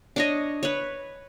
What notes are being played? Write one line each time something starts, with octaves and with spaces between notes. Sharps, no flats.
D4 C#5 D#5
B4 C#5